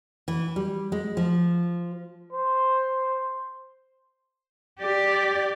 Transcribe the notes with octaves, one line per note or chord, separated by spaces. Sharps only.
E3
G3
G#3
F3
C5
G4 D5